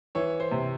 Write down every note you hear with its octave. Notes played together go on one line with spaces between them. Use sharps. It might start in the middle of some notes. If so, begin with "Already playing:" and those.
E3 C#5
C5
C3